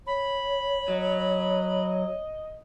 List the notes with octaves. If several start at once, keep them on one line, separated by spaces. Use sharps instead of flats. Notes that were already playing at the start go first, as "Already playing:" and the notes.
C#5 B5
F#3 D#5